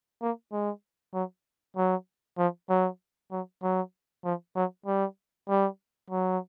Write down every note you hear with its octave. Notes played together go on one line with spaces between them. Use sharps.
A#3
G#3
F#3
F#3
F3
F#3
F#3
F#3
F3
F#3
G3
G3
F#3